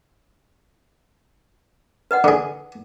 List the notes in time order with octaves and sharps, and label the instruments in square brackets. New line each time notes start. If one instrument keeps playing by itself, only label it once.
[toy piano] B4 D#5 F#5
[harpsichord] D3 G#4